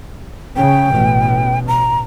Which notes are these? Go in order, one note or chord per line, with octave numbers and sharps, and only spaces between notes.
C#3 G5
A1 B2
A#5